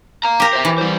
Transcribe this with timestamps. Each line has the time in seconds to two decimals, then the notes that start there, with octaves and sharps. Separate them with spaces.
0.24 F5 A#5
0.40 G4 A#4
0.53 C5 E5
0.65 E3
0.78 G3 C5